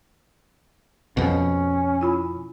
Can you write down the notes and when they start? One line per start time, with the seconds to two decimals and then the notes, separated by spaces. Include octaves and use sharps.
1.17 F2 B2 C#4
2.01 E4 F4 B5